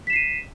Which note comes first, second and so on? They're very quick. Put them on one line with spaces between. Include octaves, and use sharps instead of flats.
B6 E7 C7 D#7